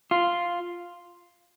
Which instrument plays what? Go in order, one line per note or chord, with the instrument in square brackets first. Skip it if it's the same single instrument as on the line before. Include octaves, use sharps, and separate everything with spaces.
[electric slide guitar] F4